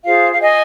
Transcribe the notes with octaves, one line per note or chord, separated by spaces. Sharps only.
F4 G#4 C5 F5
F5
D#5 G#5